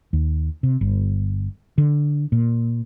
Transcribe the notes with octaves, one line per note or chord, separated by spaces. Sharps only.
D#2
C3
G1
D3
A#2